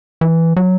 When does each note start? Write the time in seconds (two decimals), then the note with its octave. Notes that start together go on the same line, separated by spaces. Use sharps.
0.21 E3
0.56 F#3